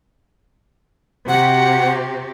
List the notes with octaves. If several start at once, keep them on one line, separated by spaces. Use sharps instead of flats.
C3 F#4 G4 F#5